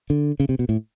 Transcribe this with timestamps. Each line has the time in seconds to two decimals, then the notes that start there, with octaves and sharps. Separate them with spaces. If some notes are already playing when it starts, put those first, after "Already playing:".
0.10 D3
0.40 C#3
0.49 C3
0.59 B2
0.69 A2